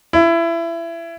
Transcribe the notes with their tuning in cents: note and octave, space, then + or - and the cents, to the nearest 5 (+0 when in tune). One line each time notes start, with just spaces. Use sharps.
E4 +25